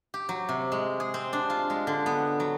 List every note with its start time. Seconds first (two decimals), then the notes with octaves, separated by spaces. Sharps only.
0.14 G4
0.29 F#3
0.49 C3
0.72 G#3
1.00 G#4
1.14 C4
1.33 D4
1.50 F4
1.70 G#3
1.87 D3
2.06 B3
2.40 F#3